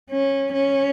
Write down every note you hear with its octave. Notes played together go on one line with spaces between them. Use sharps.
C#4
C#4